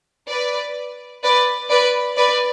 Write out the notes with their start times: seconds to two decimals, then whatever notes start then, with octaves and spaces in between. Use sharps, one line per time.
0.29 B4 D5
1.23 B4 D5
1.69 B4 D5
2.17 B4 D5